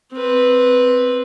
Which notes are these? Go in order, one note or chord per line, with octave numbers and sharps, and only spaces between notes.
C4 B4